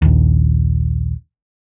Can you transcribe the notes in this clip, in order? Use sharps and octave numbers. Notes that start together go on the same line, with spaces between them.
A#1 D#2